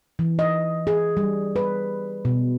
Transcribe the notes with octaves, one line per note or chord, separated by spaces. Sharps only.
E3
D#5
G#4
G3
B4
B2